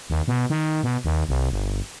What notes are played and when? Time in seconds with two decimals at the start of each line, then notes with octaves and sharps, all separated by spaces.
0.10 D#2
0.28 B2
0.50 D#3
0.84 B2
1.05 D#2
1.29 C2
1.51 G1